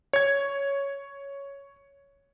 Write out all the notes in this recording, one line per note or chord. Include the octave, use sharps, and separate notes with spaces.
C#5 G#6